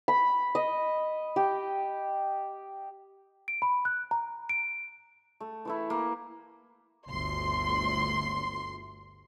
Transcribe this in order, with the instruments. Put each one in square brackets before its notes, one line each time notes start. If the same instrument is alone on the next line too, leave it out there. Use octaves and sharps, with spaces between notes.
[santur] B5
D#5
G4
[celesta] D7
B5
F#6
A#5
D7
[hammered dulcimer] A3
E3 A3 E4
A#3
[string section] G1 D2 C6